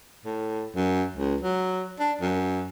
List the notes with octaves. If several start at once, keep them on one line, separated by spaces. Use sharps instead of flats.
A2
F#2
C#2
F#3
D4
F#2